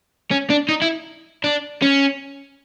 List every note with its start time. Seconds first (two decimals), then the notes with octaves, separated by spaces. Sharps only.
0.31 C#4
0.50 D4
0.69 D#4
0.82 E4
1.44 D4
1.82 C#4